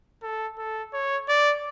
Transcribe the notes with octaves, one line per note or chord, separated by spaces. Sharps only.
A4
A4
C#5
D5